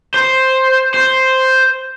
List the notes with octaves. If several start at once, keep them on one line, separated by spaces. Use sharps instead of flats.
C5
C5